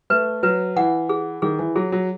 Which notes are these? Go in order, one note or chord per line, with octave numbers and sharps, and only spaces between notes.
A3 B4
F#3 B4
E3 F#5
G#4
D#3 G#4
E3
F#3 G#4
F#3